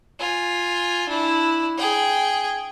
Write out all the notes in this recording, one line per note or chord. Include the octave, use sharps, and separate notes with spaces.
F4 G#5
D4 E4
G#4 G5